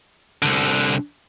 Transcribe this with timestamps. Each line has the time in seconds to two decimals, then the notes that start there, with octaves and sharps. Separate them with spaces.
0.42 C2 D3